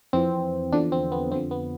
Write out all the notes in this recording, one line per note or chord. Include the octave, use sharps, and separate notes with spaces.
F2 E3 C4
E2 D3 F3 D4
C4
B3
F2 D3 F3 C4
B3